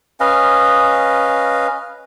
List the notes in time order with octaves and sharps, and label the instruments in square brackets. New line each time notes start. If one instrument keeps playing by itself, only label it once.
[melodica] C#4 B4 D#5 F5